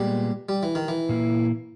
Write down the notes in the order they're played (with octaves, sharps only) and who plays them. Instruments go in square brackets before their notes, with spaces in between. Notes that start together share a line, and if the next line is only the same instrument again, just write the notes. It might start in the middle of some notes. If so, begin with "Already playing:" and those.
Already playing: [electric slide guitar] A#2 G#3 B3 [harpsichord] G3
[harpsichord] G3
E3
D#3
E3
[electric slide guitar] A#2 A#3 E4